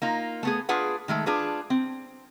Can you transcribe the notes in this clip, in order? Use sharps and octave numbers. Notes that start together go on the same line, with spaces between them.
A#3 D#4 F4
A3 B3 G#4
D4 F4 G#4 B4 F#5
D#3 G#3 A3 A4
D4 F4 G#4 B4
C4